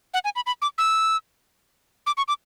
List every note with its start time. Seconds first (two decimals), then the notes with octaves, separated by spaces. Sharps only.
0.14 F#5
0.24 G#5
0.36 B5
0.46 B5
0.62 D6
0.78 E6
2.07 D6
2.17 C#6
2.28 D6